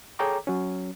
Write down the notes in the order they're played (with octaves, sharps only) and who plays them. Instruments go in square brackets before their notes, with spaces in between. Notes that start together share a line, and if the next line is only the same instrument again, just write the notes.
[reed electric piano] G#4 A4 C#5 G5 A#5 D6
F#3 C#4